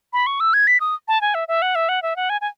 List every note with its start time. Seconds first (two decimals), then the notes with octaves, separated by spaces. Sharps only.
0.13 B5
0.27 C#6
0.40 E6
0.54 G#6
0.67 B6
0.80 D#6
1.08 A5
1.21 G#5
1.35 E5
1.48 E5
1.62 F#5
1.75 E5
1.89 F#5
2.02 E5
2.16 F#5
2.30 G#5
2.41 G#5